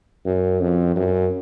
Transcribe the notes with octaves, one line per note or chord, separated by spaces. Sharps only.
F#2
F2
F#2